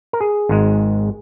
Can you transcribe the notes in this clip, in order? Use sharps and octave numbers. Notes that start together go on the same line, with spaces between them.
A#4
G#4
G#1 G#2 G#3